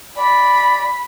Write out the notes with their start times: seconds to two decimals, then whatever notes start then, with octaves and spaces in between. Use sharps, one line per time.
0.17 D5 B5